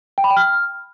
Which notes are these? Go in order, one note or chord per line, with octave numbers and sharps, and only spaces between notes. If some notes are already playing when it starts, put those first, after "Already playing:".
G5
B5
G5
F6